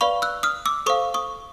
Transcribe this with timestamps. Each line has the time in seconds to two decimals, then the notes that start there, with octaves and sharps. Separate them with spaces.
0.01 B4 D5 F5 B5 C#6
0.22 E6 F#6
0.43 D#6 F6
0.66 D6 E6
0.86 A4 C5 F5 C#6 D#6
1.14 C#6 D#6